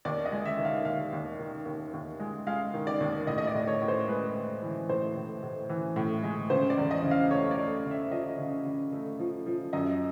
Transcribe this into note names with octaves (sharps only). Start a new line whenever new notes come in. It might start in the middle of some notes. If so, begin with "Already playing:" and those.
D#2 D5
D#5
G#3
E5
D#3
F5
D#2 F5
D#2
D#3
D#2
D#2
G#3
G#3 F5
D#3
D5
D#2
A2 D#5
D#5
D5
A2
C#5
A2
C5
G#3 B4
A2
E3
A2 C5
A2
A2
E3
A2
G#3
C#3 C5
D5
E2
D#5
C#3
F5
A3 C#5
D5
A3
C#3
E5
F3 D#5
C#3
C#3
A3
F3
F3
F#2 D#5